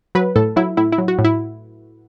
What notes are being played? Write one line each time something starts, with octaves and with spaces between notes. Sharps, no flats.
F#3 B4
A2 A4
F#3 E4
A2 E4
E4
F#3
F#4
A2
E4